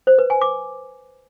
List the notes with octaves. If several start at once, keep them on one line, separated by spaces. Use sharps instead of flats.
C5
B4
G#5
D6